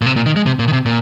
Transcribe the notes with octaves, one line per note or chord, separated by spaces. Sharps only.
A#2
C3
A#2
D#3
G#3
C3
A#2
D#3
C3
A#2